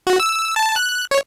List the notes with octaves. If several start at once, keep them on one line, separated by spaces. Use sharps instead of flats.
F#4
E6
A5
F#6
C#5